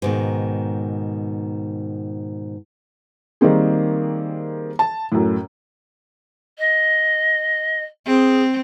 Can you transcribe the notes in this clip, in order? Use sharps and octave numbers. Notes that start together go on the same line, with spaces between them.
G#2 B2 D#3
D#3 G3 A#3 C4 G#4
A5
F#2 A2
D#5
C4 G#4